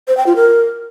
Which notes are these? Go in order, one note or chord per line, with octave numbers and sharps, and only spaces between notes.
C5
G5
F4
A#4